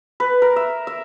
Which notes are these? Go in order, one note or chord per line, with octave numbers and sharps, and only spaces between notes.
B4
A#4
E5
E5